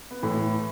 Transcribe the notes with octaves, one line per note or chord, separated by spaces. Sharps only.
B3
A2 E3 A3